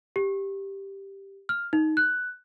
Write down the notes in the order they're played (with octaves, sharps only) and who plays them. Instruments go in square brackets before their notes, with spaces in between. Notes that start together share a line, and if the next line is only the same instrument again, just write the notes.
[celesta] G4
F6
D#4
F#6